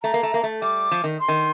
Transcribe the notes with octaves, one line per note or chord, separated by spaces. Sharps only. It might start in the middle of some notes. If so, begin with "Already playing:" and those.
A3 A#5
A#3
A3
A#3
A3
G3 D6
F3
D#3
C6
D#3